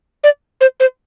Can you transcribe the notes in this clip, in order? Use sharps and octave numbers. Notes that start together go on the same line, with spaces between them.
D5
C5
C5